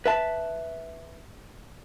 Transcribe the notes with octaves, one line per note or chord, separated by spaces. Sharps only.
B4 E5 A5